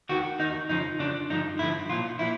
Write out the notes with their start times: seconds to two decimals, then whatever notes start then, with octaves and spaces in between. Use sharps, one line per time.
0.09 D#2 D#3 F#4
0.39 D#3 D#4
0.44 D#2
0.69 F2 C#3 F3 D#4
0.99 F2 C#3 F3 D4
1.30 G2 D3 F3 D#4
1.59 G2 D3 F3 E4
1.89 B1 A#2 F3 F4
2.19 A#2 F3 E4